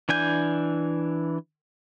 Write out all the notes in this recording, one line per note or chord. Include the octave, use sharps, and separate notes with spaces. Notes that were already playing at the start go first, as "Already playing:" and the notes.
E3 D4 G#5 G6